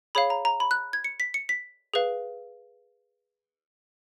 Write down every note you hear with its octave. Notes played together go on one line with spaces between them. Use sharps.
G#4 C#5 F5 B5
A#5
A#5
B5
F#6
G#6
C#7
B6
C#7
B6
G#4 B4 F5